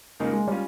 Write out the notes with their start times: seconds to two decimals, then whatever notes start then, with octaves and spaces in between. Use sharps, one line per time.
0.20 C#2 C#3 G#3 A#3 D#4
0.33 G#3
0.48 G3 C#4 F4